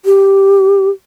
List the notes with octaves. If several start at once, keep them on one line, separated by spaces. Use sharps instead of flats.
G4